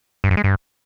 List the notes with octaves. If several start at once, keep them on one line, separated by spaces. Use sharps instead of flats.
G2
F#2
G#3
G2